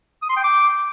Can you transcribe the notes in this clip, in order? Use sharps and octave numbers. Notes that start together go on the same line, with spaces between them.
D#6
C6
G5
D6